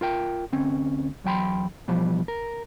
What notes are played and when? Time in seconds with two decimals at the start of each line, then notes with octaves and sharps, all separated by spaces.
0.01 F4 A#4 G5
0.52 D2 C4 C#4
1.24 E2 F#3 G5 B5 C6
1.88 B2 E3 F3 G3
2.28 A#4